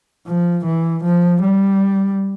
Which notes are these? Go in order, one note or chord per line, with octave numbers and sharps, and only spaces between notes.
F3
E3
F3
G3